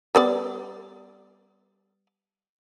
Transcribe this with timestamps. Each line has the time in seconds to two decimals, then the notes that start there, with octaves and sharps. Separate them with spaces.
0.15 G3 B3 D5